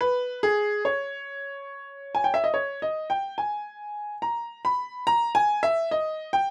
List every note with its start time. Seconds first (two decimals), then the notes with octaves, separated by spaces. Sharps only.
0.01 B4
0.43 G#4
0.85 C#5
2.15 G#5
2.24 G5
2.34 E5
2.44 D#5
2.54 C#5
2.82 D#5
3.10 G5
3.38 G#5
4.22 A#5
4.65 B5
5.07 A#5
5.35 G#5
5.63 E5
5.91 D#5
6.33 G5